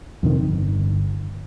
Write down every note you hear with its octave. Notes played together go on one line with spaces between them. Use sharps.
F2 C3 D#3
G1